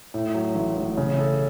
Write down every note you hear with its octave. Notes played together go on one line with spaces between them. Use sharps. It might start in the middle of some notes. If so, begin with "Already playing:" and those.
A2
F#3
A1
A1
C#3
A4